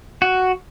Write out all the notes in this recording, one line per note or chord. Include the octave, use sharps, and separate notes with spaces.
F#4